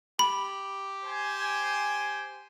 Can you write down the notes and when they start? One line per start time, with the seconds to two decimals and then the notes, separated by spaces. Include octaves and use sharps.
0.19 G4 B5
1.05 C5 G5 G#5